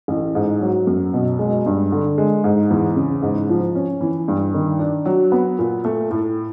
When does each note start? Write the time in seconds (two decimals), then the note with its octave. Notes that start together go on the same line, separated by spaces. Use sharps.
0.08 A1
0.35 G#2
0.61 F#3
0.87 F#2
1.14 B2
1.39 G#3
1.66 G2
1.92 D3
2.18 G#3
2.44 G#2
2.71 E2
2.96 C#3
3.22 G#2
3.49 F3
3.75 C#4
4.01 E3
4.28 G2
4.54 D#3
4.79 D4
5.05 F#3
5.32 B3
5.59 A#2
5.85 A3
6.11 A2